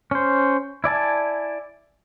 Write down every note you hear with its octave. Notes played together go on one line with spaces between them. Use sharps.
C#4 C5
E4 D5 G#5 A5